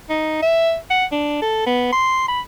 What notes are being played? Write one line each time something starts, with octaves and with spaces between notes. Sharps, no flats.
D#4
E5
F#5
D4
A4
B3
C6
B5